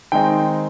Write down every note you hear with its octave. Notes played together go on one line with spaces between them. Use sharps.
D#3 G#3 C4 D#4 G5